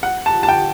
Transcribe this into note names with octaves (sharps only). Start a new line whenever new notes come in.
F#5
A5
A5
G5